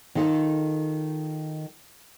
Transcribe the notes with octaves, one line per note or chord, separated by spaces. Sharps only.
D#3 F4 A4